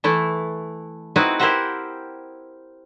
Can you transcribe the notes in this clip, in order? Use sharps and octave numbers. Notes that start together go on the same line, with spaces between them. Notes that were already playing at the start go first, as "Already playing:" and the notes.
E3 A3 E4
B3 C4 D#4 E4 F#4 B4
E4 G4 A#4 C5 E5 F#5